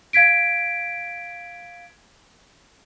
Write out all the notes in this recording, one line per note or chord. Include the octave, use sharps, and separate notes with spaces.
F5 G#6 B6 D7